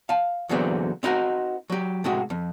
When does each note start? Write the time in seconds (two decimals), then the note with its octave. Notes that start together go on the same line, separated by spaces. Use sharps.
0.09 F5 A5
0.49 E2 A#2 D3 F#3 B3 C4
1.03 C4 D#4 E4 F#4 A#4
1.70 F#3 G4
2.04 A2 C3 G#3 F#4
2.30 F2